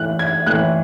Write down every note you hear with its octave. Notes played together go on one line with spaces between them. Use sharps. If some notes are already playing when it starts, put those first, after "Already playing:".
Already playing: A2 E3 F#6
G#6
A2 E3 F#6